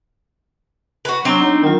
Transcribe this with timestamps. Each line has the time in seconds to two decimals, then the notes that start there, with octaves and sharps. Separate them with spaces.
1.05 F#4 B4
1.25 F#3 B3 C4 D4
1.41 D#4
1.63 D#3 F#3 F4